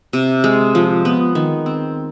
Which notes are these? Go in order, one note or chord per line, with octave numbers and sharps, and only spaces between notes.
C3
G#3
F3
B3
D#3
C4